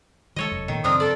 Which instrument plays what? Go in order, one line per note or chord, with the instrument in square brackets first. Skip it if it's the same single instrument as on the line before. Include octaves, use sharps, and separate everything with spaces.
[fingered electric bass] D#3 G#3 [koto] A4 C#5 D#5
[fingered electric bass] F1 F#2
[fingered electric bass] A#2 A3 [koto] D#3
[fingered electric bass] F#2 C#3 F3 [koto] C4 D4 A#4 [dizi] D#6
[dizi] A4 [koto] D5